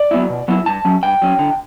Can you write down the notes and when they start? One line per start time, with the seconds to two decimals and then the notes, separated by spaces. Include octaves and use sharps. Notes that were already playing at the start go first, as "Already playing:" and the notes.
Already playing: D5
0.11 F#3 B3 E4
0.30 B2
0.48 F#3 B3 E4
0.66 G2 A5
0.85 F#3 C#4
1.03 G2 G5
1.22 F#3 C#4
1.39 D3